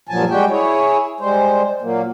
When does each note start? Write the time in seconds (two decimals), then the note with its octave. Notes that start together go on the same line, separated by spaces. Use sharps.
0.09 G2 A#2 F3 F#3 G#5 A5
0.30 G3 G#3 F#4 G4 G5
0.50 E4 G#4 C#5
1.20 G3 G#3 C5
1.82 A#2 F#3 A#3